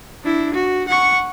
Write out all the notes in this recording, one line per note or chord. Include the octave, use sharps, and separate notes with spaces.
D4 E4
F#4
F#5 C#6